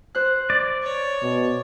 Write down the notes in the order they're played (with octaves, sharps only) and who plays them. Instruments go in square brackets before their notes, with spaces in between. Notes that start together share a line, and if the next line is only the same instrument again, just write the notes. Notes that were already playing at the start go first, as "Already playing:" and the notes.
[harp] C5 F#6
[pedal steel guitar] D5
[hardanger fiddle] C#5
[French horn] B2